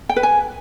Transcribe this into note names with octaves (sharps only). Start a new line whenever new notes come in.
G5
B4
G#5